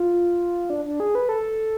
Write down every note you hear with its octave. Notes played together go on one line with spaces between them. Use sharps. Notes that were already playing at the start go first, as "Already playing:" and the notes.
Already playing: F4
D4
D4
G#4
B4
A4